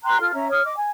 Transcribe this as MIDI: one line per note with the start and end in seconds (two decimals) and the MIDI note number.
0.04 0.19 79
0.04 0.19 82
0.04 0.19 84
0.04 0.19 90
0.20 0.31 65
0.20 0.31 69
0.20 0.31 89
0.34 0.48 61
0.34 0.48 76
0.34 0.48 82
0.50 0.62 73
0.50 0.62 87
0.50 0.62 89
0.64 0.74 75
0.64 0.74 86
0.77 0.90 80